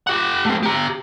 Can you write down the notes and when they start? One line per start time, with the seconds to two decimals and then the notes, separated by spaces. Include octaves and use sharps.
0.07 G4 F#5
0.45 A3 C4
0.63 G4 A#5